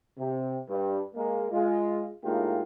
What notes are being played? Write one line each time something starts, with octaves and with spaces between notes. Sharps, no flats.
C3
G2
G#3 A#3
G#3 F4
A2 G#3 A#3 D#4 F4 G4